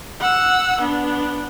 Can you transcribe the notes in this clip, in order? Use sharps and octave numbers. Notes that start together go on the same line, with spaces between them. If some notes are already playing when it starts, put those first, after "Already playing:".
F#5 E6
B3 D4